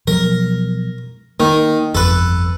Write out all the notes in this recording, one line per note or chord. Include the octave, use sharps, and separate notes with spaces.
B2 F3 F#3 A#4
D#3 A#3
G1 F2 A4 B4